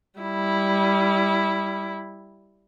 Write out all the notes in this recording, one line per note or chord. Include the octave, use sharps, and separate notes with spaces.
G3 E4